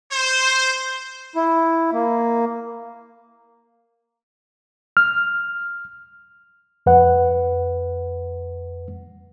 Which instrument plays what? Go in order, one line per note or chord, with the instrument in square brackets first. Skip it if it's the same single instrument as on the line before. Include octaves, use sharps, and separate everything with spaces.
[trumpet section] C5
[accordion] E4
A#3
[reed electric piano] F6
F2 B4 F#5